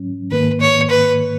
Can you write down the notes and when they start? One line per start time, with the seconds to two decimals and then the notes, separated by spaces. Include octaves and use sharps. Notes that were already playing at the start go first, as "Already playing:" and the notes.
Already playing: G#2 F#3 C#4
0.31 G#2 D#3 A#3 B4
0.61 C#5
0.90 B4